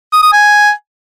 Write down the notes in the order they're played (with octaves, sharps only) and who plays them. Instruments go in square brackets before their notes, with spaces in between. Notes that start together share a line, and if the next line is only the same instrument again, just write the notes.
[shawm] D#6
D#6
G#5